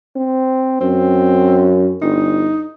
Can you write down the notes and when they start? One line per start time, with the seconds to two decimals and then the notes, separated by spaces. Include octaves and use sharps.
0.16 C4
0.81 F#2 C4
2.02 G1 D#4